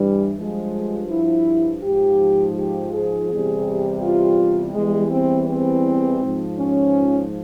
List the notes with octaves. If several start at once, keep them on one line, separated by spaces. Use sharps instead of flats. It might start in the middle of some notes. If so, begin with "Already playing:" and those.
Already playing: G2 E3 G3
G2 F3 G#3
E4
G#2 F3 G4
G4
G#4
E2 C3 G3
F4
E2 E3 G3 G#3
C4
C4
G#2 F3
C#4